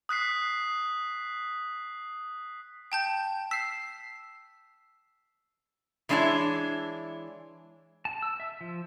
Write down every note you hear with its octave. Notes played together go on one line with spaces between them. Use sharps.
D#6 F#6 B6 C7
G5 A5 G6
E6 B6 C7
E3 G#3 D4 E4 C#5
A5
E6
E5
F3